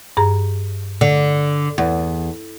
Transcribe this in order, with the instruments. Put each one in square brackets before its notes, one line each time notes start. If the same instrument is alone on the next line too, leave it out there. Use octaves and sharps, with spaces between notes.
[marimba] G2 G#4 A#5
[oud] D3
E2